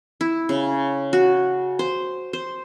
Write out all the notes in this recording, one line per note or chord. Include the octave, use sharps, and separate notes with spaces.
E4
C#3
F#4
C5
C5